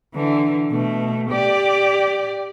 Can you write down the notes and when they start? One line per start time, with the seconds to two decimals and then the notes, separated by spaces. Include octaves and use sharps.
0.15 D3 E3
0.71 B2 A3
1.30 G4 D5